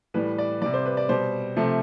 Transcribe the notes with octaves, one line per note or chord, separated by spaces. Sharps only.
A2 E3 G3 B4
D5
C3 G3 D5
C5
B4
D5
B2 G3 C5
C3 F3 A3